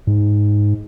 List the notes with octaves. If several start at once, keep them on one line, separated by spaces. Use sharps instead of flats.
G#2